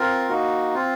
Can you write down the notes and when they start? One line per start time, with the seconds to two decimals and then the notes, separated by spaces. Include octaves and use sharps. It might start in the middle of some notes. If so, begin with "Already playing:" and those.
Already playing: C4 F4 A#4
0.29 A#3 D#4 F#4
0.74 C4 F4